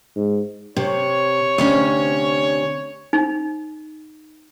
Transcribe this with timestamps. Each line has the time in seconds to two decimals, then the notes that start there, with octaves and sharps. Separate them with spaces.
0.16 G#2
0.76 C3 C#5
1.58 D2 C3 C#4
3.13 D#4